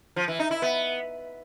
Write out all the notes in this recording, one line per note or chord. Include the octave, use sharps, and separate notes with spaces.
F3
E3
D#4
E4
B3